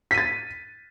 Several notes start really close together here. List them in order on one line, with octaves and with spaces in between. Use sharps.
B6 D#7 A6